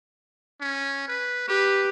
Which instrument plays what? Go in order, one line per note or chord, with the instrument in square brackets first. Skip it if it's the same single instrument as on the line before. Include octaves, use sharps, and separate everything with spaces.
[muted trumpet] C#4
B4
[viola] G4 [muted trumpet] B4